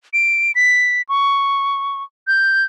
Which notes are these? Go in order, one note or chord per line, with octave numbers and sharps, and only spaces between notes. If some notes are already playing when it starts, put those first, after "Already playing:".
D7
B6
C#6
G6